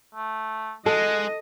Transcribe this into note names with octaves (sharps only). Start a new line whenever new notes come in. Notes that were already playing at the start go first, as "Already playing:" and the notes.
A3
G#3 A4 D#5 F#5